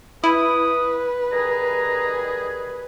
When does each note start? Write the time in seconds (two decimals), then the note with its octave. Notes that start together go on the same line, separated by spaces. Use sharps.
0.24 E4 B4 D#6
1.32 D#3 G3 G#4 A#5